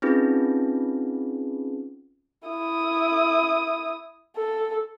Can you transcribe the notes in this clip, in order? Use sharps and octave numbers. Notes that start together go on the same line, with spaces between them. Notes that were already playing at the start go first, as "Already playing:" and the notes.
C4 C#4 D#4 F4 G#4 B4
E4 D#6
A4